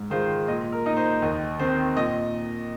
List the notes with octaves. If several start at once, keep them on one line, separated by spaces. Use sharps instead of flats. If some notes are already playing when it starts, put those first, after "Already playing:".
Already playing: G#2
D#3 G#3 F4 C5
A#2 D#5
A#4
A#3 D#4 D#5
C5
D#2 D#5
D#3 C4 C5
A#2 D#5